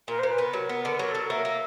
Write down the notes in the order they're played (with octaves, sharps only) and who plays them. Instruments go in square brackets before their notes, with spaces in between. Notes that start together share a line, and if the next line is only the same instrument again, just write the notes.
[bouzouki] A#2 [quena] A#4
[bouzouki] A#2 [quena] C5
[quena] B4
[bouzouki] B3 [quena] A#4
[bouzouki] F#3
B3
D3
[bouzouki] F#3 [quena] A#4
[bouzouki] F#3 [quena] A4
[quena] A#4
[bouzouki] A#3 [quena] E5
[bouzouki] A#3